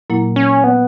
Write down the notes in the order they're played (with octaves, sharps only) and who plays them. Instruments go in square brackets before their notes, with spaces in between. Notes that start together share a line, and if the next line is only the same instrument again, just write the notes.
[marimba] A#2 F#3 A#3 E4
[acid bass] C#4
B3